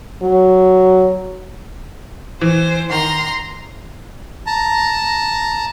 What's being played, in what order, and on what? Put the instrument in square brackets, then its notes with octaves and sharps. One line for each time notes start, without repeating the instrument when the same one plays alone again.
[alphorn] F#3
[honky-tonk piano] E3 [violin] C5
[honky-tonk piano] D#3 [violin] A#5 C6
[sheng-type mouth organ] A5 A#5